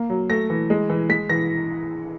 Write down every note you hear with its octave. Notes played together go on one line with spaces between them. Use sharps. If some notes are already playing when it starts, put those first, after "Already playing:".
Already playing: A#3
F#3
A3 A#6
E3
G#3
E3
G#3 B6
E3 A#6